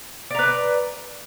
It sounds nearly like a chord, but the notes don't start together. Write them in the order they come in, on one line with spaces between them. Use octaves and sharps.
D5 A#5 B4